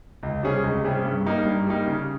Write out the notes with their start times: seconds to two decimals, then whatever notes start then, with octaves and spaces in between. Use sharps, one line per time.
0.23 C#2
0.43 C3 G3 C#4 G#4
0.64 C#2
0.84 C3 G3 C#4 G#4
1.05 G2
1.26 G3 A#3 D#4
1.45 G2
1.66 G3 A#3 D#4
1.88 C#3